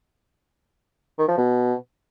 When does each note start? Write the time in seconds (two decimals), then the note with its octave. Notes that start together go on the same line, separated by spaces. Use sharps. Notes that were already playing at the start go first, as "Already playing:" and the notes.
1.19 D#3
1.28 F3
1.38 B2